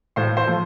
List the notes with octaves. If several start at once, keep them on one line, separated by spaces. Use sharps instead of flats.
A2 C5 C6
C5 C6
F3 A3